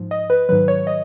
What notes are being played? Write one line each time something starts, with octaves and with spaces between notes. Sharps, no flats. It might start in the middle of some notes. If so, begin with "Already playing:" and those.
Already playing: G#2 F3
D#5
B4
G#2 D#3 F#3 B4
C#5
D#5